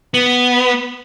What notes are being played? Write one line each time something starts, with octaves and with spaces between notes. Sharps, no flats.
B3